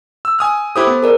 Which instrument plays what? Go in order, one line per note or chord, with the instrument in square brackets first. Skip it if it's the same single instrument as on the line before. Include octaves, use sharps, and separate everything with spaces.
[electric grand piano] E6
G#5 D#6 F6
[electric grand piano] E4 G4 D#6 [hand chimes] A4 C5 D6
[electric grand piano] B3
[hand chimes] G#4 A#4 D5